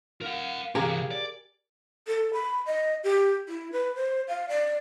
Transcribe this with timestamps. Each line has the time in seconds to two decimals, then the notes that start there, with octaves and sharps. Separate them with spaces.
0.21 A#4 F5 F#5
0.75 C3 E3 G4 G#4 A#4
1.11 D5
2.07 A4
2.33 B5
2.66 D#5
3.04 G4
3.49 E4
3.72 B4
3.96 C5
4.28 F5
4.49 D5